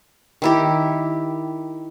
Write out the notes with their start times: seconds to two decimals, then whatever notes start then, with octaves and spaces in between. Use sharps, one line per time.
0.42 D#3 E4 G4